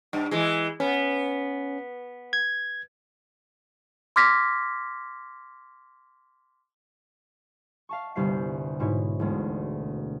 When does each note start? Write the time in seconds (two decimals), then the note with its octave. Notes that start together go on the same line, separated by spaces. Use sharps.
0.13 G2
0.31 E3 G#3
0.80 B3 C#4
2.33 G#6
4.16 C6 D6 F6 G#6 A#6 B6
7.89 F5 A5 C#6
8.15 G1 C2 C3 C5 F5 C7
8.80 G#2 B2 E4 C#5
9.19 E1 D2 G#3